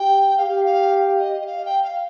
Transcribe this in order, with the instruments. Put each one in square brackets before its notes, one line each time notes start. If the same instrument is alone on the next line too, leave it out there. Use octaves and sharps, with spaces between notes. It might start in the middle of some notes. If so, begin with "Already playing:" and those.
Already playing: [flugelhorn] G4 [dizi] G5
[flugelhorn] G4 [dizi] F5
[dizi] F5
D#5
D#5
F5
G5
F5